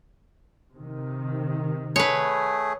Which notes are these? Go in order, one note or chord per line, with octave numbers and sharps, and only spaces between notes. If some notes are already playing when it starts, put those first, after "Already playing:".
C3 D#3
A3 G#4 B4 C#5